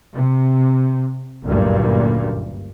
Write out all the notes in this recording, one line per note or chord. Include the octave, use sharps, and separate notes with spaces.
C3
F#1 D2 G2 A#2